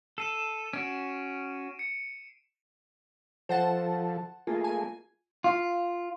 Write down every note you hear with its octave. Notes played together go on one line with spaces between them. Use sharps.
A4 C7 D#7 E7
C#4 F#4 D7
C#7
F3 A4 C5 F#5 A5
A3 A#3 F4 G#4
G#5
F4